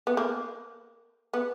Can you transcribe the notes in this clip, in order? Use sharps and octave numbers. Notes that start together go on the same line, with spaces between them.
B3
A#3
B3